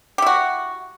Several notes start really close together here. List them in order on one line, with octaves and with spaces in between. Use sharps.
G4 E4 F#4